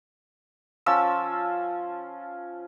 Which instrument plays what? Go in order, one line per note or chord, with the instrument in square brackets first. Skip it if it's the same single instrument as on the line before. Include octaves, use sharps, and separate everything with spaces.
[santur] F3 C#4 F4 E6